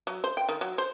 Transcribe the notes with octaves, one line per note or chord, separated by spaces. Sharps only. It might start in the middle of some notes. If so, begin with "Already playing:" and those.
F#3
C5
G5
D#3
F#3
C5